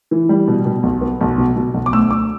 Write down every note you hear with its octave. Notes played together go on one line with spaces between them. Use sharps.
E3
G3
B2
B2
B1
B3
B1
B2
B2
B1
D6
D2 E6
D2 D6